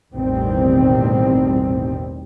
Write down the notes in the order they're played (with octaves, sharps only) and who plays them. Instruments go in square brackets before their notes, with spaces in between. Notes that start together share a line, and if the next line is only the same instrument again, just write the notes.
[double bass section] A1 E2 B2 D#3 G3 C4